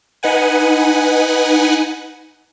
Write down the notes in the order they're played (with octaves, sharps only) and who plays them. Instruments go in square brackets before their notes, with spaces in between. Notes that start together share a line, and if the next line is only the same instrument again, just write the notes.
[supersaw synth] D#4 B4 F#5 G#5